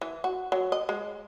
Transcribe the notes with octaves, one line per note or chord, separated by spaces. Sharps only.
E3
F#4
F#3
D#5
G#3